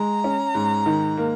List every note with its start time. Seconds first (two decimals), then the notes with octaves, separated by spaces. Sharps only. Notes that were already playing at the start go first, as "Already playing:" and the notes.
Already playing: G#3 A#5
0.24 C#4
0.54 G#2
0.86 D#3
1.17 A#3